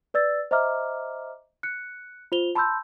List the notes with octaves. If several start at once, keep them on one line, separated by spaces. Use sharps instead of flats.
B4 D5 E6 A6
C5 D#5 E5 A#5 D6 F6
F#6 C#7
F4 C5 F7 G7
A5 B5 C6 E6 G6